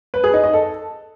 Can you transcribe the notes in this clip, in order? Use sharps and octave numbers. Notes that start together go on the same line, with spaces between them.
B4
G#4
D#4
D#5
A4